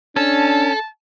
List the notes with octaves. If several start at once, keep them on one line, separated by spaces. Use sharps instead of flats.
C#4 D4 A4 A5